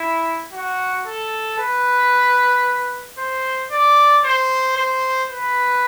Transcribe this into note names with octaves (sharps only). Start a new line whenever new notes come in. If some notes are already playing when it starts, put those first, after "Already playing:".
Already playing: E4
F#4
A4
B4
C5
D5
C5
C5
B4